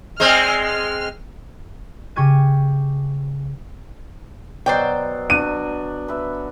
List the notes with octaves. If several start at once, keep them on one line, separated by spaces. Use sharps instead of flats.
G#3 C4 D5 G#5 F6
F6
C#3 G4 C#6 G#6 D#7
B2 F#3 C5 D5 G5
D4 F#4 D#7
B4 E5